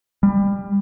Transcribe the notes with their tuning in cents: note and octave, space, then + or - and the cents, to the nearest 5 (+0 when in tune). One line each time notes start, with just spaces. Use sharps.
G3 +25